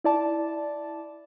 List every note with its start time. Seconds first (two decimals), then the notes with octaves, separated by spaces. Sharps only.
0.04 E4 D5 A5